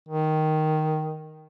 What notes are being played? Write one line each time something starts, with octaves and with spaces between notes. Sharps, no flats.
D#3